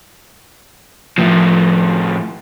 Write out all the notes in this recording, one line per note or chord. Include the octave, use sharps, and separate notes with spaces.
A2 F3